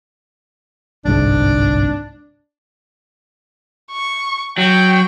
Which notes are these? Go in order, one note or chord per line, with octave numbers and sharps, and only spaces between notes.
G1 C2 G#2 D4
C#6
F#3 G5